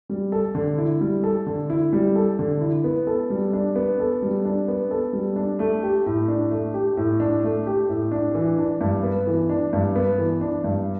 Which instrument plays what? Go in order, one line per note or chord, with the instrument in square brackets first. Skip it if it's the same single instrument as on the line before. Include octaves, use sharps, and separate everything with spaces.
[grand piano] G3
A4
D3
E4
G3
A4
D3
E4
G3
A4
D3
E4
B3
A4
G3
D4
B3
A4
G3
D4
B3
A4
G3
D4
A3
G4
A2
D4
A3
G4
A2
D4
A3
G4
A2
D4
E3
D4
G2
B3
E3
D4
G2
B3
E3
D4
G2